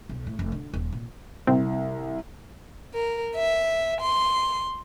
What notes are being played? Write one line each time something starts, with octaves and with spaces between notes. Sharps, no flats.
B1
A2
F1
D3
D#1
A#2
C2 C4
A#4
E5
C6